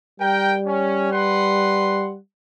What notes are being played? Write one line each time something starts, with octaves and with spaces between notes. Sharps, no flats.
G3 A#4 G5
C#4
B4 F#5 C6